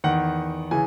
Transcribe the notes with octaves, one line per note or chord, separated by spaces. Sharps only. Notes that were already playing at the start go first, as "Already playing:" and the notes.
E2 D#3 F#5
C#3 E3 G#5